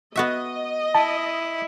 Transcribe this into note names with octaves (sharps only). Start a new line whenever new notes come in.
B3 F#4 D#5 E5
E4 A5